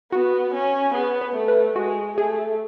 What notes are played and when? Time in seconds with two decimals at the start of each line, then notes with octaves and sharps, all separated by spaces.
0.12 B3 F#4
0.53 C#4
0.94 B3 G#4
1.21 B4
1.35 A3
1.48 B4
1.76 G#3 F#4
2.17 A3 G#4